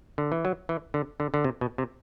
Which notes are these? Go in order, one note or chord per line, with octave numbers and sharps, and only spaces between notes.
D3
E3
F#3
E3
D3
D3
D3
C3
B2
C3